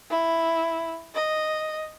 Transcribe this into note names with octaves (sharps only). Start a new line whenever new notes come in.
E4
D#5